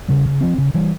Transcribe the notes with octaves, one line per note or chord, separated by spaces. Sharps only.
C#3 G3
C#3
F3 C4
C#3
E3 G3